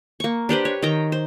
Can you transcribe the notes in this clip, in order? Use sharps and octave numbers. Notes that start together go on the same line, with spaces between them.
A#3 C#6
D4 G4 B4 C5
C#5
D#3 G5 A#5
C5